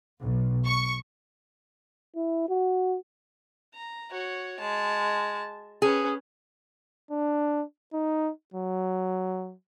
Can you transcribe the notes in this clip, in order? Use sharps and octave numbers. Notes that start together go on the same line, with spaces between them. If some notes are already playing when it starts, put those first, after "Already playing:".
B1
C#6
E4
F#4
A#5
F#4 C#5
G#3 A5
C#4 G#4 B4
D4
D#4
F#3